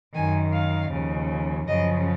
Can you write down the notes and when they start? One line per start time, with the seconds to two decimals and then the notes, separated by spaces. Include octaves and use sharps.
0.14 F#2 D#3 G#5
0.53 F5
0.91 D#2 C#3 F3
1.68 F#2 C#3 F3 D#5